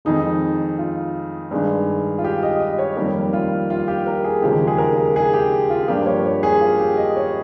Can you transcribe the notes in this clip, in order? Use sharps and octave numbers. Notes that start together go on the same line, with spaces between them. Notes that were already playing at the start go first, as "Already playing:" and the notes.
F2 D#3 G#3 D#4
F4
G2 D#3 G#3
F4
G4
D#5
D#5
C#5
F2 D#3 G3 A#3 G4
F4
F4
G4
A#4
G#4
D#2 C#3 F3 G#3 G4
G#4
A#4
G#4
G4
F4
G2 F3 A#3 G4
C#5
C#5
G#4
F4
G4
D#5
C#5